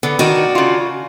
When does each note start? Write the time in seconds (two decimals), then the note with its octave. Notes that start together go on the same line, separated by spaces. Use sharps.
0.03 D3 B3
0.19 D#3 D4 D#4 F#4
0.55 C#3 F4